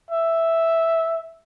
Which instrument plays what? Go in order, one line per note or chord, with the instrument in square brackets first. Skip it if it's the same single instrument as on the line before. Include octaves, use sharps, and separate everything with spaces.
[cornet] E5